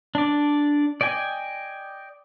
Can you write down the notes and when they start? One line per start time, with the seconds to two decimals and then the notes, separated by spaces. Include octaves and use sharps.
0.15 D4 D5
1.01 D5 D#5 G5 G#5